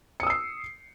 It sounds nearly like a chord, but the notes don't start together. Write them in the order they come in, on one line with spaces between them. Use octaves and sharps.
C#7 D#6 E6 C7